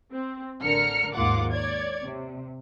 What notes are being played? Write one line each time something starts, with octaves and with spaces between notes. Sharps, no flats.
C4
A1 D3 A#4 F6 C#7
D#2 G#2 A#3 F4 F#5 D6
C#5 D5 G#6
C3